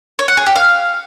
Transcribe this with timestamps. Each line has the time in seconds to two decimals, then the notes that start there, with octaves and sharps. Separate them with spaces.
0.19 C#5
0.28 F#5
0.37 G#4
0.46 G4
0.56 F5